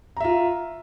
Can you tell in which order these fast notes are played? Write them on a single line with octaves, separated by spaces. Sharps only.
A#5 E5 F4